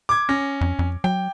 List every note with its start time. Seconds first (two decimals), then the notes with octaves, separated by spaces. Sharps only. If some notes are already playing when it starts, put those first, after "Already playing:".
0.09 D6 G#6
0.29 C#4 A#6
0.61 F2
0.79 F2
1.04 F#3 G5